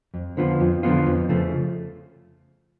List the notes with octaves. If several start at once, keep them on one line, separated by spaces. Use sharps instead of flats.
F2
D3 F3 B3 F4
F2
D3 F3 B3 F4
F2
C#3 F3 A3